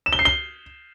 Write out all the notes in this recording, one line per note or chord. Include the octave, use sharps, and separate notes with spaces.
E7
G7
C7
G7